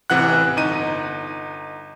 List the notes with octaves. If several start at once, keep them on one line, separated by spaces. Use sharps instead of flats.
A1 C3 E3 F#5 F#6
G1 D#4 D#7